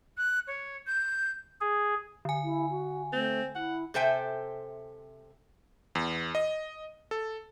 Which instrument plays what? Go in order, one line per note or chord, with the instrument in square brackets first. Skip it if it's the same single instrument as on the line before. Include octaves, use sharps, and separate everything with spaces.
[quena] F#6
C#5
G6
[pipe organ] G#4
[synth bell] D3 G#5
[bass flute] E4
F#4
[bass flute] A3 [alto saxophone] C4
[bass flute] E4 [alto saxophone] F#5
[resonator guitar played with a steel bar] C3 A4 C5 E5 G5 G#5
[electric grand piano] E2
D#5
A4